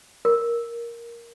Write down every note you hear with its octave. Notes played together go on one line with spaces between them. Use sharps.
A#4